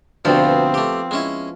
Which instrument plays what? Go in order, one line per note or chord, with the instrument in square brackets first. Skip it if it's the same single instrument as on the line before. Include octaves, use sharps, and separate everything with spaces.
[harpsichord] D2 G2 B2 [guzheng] F3 B3 [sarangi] C4
[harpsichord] A3 G4
G#3 C#4 E4